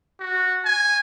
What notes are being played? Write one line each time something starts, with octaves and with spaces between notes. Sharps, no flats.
F#4
G#5